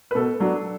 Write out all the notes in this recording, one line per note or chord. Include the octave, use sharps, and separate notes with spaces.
B4
B2 A4
F#3 D4